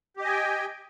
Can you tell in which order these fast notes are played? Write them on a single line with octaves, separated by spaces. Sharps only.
G4 D#5 G#5 G5